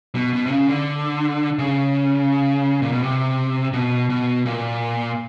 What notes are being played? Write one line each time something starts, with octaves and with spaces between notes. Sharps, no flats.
B2
B2
C3
C#3
D3
C#3
A#2
B2
C3
B2
B2
A#2